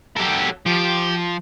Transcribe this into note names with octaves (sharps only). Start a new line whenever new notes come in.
F#3 G4 A4 A#4
F3 G4